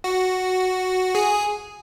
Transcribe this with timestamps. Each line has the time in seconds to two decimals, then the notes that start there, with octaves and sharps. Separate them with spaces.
0.04 F#4
1.15 G#4